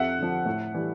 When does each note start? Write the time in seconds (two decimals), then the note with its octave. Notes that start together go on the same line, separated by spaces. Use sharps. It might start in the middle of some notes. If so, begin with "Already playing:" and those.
Already playing: F2 E5 F#5
0.19 D3 F3
0.46 A2
0.74 E3 G3